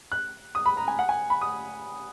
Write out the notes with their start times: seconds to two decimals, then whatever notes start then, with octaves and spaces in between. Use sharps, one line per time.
0.12 F#6
0.55 D#6
0.66 B5
0.77 A#5
0.88 G#5
0.99 F#5
1.09 G#5
1.30 B5
1.41 D#6